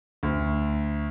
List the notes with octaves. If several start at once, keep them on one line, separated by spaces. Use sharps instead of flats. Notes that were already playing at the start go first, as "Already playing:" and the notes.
D2